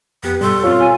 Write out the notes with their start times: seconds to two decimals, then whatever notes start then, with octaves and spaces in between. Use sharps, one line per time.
0.24 F2 B3 G4
0.41 G2 B2 G3 A4 C6
0.64 C4 F4 C#5
0.79 G#5